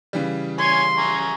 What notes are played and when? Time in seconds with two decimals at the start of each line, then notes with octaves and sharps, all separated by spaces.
0.13 C#3 E3 G3
0.60 C#5 G#5 C6
0.98 G#5 A#5 C#6